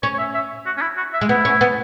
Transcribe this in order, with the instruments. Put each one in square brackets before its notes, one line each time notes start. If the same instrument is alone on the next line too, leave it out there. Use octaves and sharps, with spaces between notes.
[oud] C#4 [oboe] C#5
[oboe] C#5
E5
E5
F#4
C#4
E4
F#4
E5
[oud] G#3
[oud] B3 [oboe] E4
[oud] C#4
B3